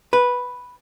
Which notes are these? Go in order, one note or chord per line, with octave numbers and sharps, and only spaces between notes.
B4